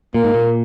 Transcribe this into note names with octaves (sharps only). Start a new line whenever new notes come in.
A#2 A#3
G#2
A#2